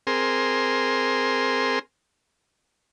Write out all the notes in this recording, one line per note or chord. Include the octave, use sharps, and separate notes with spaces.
C4 G#4 A#4 C6